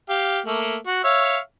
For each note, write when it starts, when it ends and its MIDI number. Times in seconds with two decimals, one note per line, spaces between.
0.09 0.40 67
0.09 0.40 77
0.46 0.76 57
0.46 0.76 58
0.87 1.00 66
1.04 1.38 73
1.04 1.38 76
1.04 1.38 77